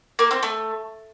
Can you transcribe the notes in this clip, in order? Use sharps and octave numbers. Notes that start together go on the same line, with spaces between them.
A#3
C4
A3